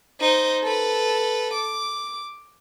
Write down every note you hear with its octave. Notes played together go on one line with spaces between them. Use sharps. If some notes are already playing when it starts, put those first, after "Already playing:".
D#4 C5
A4 B4
D6